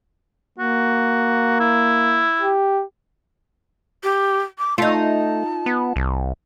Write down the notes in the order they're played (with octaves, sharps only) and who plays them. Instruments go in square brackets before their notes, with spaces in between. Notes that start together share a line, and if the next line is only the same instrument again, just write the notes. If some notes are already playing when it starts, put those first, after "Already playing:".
[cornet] A#3 [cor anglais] F#4
[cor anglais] E4
[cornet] G4
[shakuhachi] G4
D6
[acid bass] A3 [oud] D#4 F4 [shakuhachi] A5
[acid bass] B3
C2